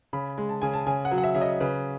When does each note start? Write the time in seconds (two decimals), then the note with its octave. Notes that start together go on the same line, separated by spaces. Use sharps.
0.13 C#3 B5
0.38 G#3
0.49 A5
0.62 C#3 G#5
0.74 A5
0.86 C#3 G#5
1.05 F#5
1.11 F#3
1.18 F#5
1.24 E5
1.35 C#3 E5
1.42 D#5
1.60 C#3 B4